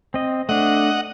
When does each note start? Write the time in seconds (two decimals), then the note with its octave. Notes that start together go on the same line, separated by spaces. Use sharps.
0.14 C4 D#5
0.49 A3 D4 D#5 F#5